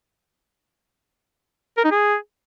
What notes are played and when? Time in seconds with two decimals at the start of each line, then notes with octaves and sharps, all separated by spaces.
1.78 A#4
1.84 D#4
1.91 G#4